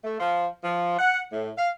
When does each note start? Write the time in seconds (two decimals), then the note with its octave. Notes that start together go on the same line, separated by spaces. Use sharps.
0.04 A3
0.19 F3
0.64 F3
0.99 F#5
1.32 A2
1.58 F5